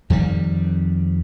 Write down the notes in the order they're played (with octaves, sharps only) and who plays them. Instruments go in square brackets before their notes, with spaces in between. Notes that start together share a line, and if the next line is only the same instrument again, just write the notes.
[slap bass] F2 D#3 G3